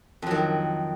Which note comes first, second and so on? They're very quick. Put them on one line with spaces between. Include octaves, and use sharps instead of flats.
F2 F#3 D#3